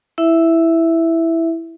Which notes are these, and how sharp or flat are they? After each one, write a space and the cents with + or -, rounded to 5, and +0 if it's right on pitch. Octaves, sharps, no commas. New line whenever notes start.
E4 +0 E5 +0